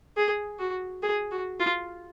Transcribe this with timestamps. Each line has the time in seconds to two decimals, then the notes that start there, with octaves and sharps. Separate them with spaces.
0.17 G#4
0.59 F#4
1.03 G#4
1.31 F#4
1.60 F4